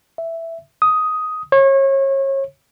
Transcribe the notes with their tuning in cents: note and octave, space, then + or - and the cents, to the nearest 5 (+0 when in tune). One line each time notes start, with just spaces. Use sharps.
E5 +5
D#6 +10
C#5 -30